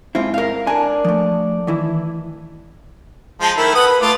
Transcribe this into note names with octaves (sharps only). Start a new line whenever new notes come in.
G#2 C4 E4 F4
A#4 F5
D4 A#4 G#5
F3 A3
D#3 E3 E4
F3 G#3 A5
D#3 A3 E4 A#4
A4 B4 F#5 D#6
B5
A3 F4 D5